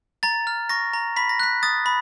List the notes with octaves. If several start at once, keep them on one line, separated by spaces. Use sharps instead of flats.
A#5 A6
F6
C#6 A#6
A#5
B5 B6
A#6
F#6 B6
D#6 A6
B5